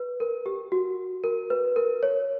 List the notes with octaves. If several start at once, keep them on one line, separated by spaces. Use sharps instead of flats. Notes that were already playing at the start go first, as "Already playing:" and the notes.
Already playing: B4
A#4
G4
F#4
A#4
B4
A#4
C#5